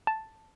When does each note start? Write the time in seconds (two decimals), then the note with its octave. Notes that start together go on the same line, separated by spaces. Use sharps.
0.07 A5